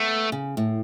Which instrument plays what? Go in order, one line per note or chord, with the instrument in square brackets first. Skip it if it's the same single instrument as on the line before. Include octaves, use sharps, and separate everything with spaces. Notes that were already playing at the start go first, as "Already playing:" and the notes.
Already playing: [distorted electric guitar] A3 [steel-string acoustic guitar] B3
[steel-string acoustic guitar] C#3
A2